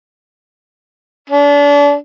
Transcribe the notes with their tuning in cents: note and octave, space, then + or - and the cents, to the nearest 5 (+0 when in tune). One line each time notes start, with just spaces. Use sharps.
D4 -35